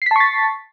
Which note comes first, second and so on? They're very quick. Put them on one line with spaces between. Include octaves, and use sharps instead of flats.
C7 B6 A5 C#6 A6